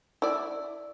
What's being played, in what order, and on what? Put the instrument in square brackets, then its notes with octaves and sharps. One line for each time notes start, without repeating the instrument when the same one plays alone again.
[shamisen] E4 D5